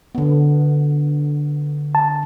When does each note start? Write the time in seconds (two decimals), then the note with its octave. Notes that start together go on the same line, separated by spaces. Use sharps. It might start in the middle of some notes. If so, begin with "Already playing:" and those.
0.15 D3 B3
1.95 A5